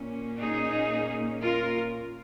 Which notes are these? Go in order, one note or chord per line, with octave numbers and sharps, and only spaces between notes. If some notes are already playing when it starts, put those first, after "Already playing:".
Already playing: A#2 A#3 C#4
D#4 G#4
F4 A#4